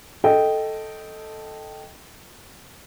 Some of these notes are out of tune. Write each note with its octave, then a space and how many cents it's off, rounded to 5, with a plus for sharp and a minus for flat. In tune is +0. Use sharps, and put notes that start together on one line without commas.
A4 +0 D#5 +0 G5 -10